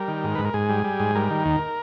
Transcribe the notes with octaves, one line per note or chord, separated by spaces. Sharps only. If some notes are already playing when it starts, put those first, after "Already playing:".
Already playing: G3 A#4
D#3
G#2
G#2 B4
A#4
G#2 G#4
G3
G3
G#2
G3 A#4
D#3
D#2